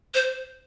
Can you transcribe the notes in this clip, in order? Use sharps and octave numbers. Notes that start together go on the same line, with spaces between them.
C5